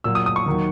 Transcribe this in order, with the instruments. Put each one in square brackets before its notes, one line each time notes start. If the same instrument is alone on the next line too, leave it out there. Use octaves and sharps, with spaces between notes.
[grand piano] A#2 F#3 E6
D#6
D#6
C#6
D#2 D#3 F#3